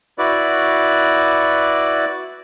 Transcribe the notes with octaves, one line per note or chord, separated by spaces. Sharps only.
E4 F#4 B4 D5